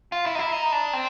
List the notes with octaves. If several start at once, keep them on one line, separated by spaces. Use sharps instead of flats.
F4
E4
D#4
E4
D#4
D4
C4